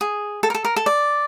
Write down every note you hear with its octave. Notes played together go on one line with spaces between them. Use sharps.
G#4
A4
A#4
A4
A#4
A4
D5